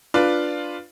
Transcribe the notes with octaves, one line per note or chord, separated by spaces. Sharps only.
D4 F4 B4